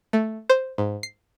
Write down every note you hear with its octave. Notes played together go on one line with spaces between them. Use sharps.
A3
C5
G#2
C7